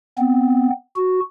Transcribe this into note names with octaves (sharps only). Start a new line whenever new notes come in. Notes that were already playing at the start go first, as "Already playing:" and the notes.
B3 C4
F#4